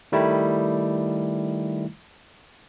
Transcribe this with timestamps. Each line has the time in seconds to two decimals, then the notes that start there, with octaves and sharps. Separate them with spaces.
0.12 D#3 G3 A3 D#4 E4